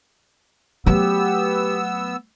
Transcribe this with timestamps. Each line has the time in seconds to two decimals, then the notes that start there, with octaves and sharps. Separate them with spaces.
0.86 F#3 A3 B3 G4 E6